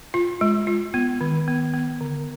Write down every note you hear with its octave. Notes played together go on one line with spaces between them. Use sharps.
F4
G#3
F4
B3
D#3
B3
B3
D3